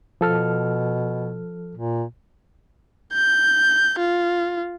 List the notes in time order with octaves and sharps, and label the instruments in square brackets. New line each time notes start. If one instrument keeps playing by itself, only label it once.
[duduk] B2 [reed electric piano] F3 A4 F6
[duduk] A#2
[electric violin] G6
F4